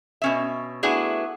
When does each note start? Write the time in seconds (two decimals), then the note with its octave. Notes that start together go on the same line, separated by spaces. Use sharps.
0.22 B2 C#4 E5
0.83 A3 B3 D4 E4 F#4 G#4